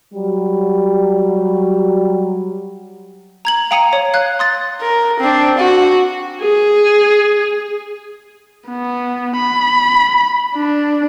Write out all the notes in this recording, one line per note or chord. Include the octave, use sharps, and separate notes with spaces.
F#3 G3
A#5 G#6 F#7
F5 G5 A#5 D#6 C#7 D#7
C#5
F5 F#6 G#6
C6 D#6 A6
A#4
C4 D4
F#4
G#4
B3
B5
D4